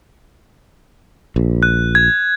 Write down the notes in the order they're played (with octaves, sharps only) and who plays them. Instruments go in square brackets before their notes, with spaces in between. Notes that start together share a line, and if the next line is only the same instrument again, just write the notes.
[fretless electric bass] A#1
[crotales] F#6
G#6